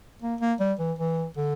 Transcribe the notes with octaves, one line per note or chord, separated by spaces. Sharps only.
A#3
A#3
G3
E3
E3
D3